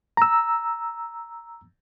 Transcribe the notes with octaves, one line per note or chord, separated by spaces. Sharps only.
A#5 E6